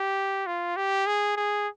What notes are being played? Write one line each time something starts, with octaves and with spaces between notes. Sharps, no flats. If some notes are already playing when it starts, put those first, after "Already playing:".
Already playing: G4
F4
G4
G#4
G#4